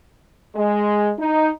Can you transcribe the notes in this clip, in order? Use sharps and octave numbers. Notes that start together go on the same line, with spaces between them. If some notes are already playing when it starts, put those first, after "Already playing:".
G#3
D#4